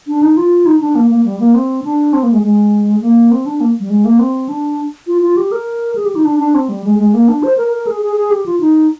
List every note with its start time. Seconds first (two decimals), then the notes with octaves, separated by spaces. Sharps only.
0.07 D4
0.22 D#4
0.37 F4
0.66 D#4
0.81 D4
0.95 A#3
1.11 A#3
1.25 G3
1.40 A#3
1.54 C4
1.84 D4
2.13 C4
2.23 A#3
2.33 G#3
2.43 G#3
3.01 A#3
3.31 C4
3.46 D4
3.61 A#3
3.80 G3
3.90 G#3
4.05 A#3
4.19 C4
4.49 D4
5.07 F4
5.22 F4
5.37 G4
5.52 A#4
5.96 G#4
6.05 G4
6.15 D#4
6.25 D4
6.40 D4
6.55 C4
6.69 G3
6.84 G#3
6.99 G#3
7.14 A#3
7.28 D4
7.43 C5
7.57 A#4
7.72 A#4
7.87 G#4
8.02 G#4
8.16 G#4
8.31 G4
8.46 F4
8.60 D#4